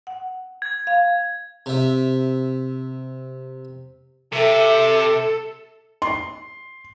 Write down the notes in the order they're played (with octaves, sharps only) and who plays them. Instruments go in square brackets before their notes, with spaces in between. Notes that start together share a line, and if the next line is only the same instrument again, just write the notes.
[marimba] F#5
[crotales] G#6
[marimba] F5
[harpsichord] C3 E5
[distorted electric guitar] C3 [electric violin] A4 [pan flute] E5
[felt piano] C6